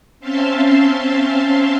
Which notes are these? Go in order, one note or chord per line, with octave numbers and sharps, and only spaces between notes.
C4 C#4 E5 F5 A5 C6